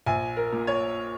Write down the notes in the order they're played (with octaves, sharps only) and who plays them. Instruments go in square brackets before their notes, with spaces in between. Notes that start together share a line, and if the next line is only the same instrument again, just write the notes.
[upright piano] A#1 G#5
A#4
A#2
C#5